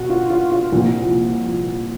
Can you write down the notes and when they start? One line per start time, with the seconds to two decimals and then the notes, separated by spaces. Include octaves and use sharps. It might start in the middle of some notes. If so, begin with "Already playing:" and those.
Already playing: B2 F#4
0.10 F4
0.30 F4
0.52 F4
0.72 C2 A#2 F3